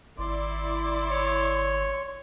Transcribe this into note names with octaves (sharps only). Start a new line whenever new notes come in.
G#1 E4 D5 C6
C#5